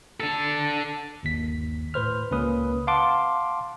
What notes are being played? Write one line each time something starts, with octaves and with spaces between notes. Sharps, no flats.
D4 A4
G1 D#2 B6
A2 B4 C5 F6
C#2 A#3 C#4 B4 D#6
F5 F#5 A5 C6 D6